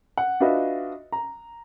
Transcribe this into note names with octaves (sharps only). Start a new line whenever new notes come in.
F#5
D4 F4 F#4 B4 D#5 E5
A#5